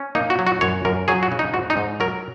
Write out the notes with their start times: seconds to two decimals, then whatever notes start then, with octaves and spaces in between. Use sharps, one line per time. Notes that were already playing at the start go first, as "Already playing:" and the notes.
Already playing: C#4
0.15 A#3 D#4
0.30 F#4
0.39 F#3
0.47 F#4
0.61 F#2 C#5
0.85 F#2 A#4
1.08 F#3 G#4
1.23 F#4
1.32 C#3
1.39 D#4
1.54 G#2 F#4
1.70 D#4
1.77 G#2
2.00 F#3 A#4